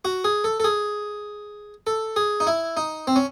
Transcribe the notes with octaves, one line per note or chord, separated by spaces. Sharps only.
F#4
G#4
A4
A4
G#4
A4
G#4
D#4
E4
D#4
C4
C#4